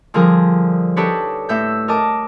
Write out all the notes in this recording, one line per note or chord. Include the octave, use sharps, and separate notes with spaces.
D3 F3 G3 G#4 A#4
D4 D#4 G4 A4 B4 C#5
A2 E5 G6
A#4 D#5 A5 D6